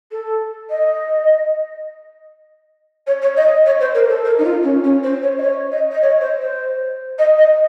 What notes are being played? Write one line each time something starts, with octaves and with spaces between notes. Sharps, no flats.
A4
D#5
C#5
C#5
D#5
C#5
C5
A#4
A4
A#4
D#4
F4
C#4
C#4
C5
C#5
D#5
C#5
D#5
D#5
C#5
C5
C5
D#5
D#5